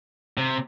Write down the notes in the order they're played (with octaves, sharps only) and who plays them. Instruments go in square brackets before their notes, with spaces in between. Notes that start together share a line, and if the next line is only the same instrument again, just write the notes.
[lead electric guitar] C3